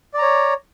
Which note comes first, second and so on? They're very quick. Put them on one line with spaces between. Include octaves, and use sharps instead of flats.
D5 A#5 C#5